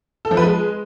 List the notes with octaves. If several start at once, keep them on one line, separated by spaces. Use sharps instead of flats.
A4
F3
B4
G#3